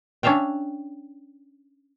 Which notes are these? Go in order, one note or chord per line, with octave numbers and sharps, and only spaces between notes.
C#4 D4 E5 F5 G5